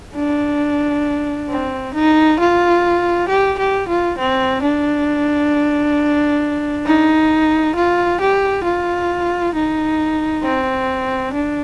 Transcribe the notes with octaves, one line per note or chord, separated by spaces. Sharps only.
D4
C4
D#4
F4
G4
G4
F4
C4
D4
D#4
F4
G4
F4
D#4
C4
D4